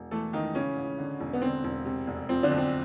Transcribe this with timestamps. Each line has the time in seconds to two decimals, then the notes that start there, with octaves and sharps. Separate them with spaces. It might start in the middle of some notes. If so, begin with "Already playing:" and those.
Already playing: E1
0.11 E3 A3 A4
0.33 C#2 D#3 D#4
0.55 C#3 E3 C#4
0.77 A1
0.99 D3
1.20 E1
1.33 B3
1.42 D3 C4
1.64 E1
1.85 C3
2.07 F1
2.29 F3 C4
2.43 D3 D4
2.51 B1
2.58 C4